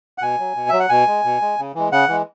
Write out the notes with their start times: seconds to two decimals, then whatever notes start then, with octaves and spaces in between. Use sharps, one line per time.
0.18 F#5
0.22 B2 G#5
0.39 F#3
0.56 B2
0.69 F#3 E5
0.80 F#5
0.89 B2 G#5
1.07 G#3
1.24 B2
1.41 G#3
1.58 C#3
1.75 E3 G#3
1.92 C#3 F#5
2.09 E3 G#3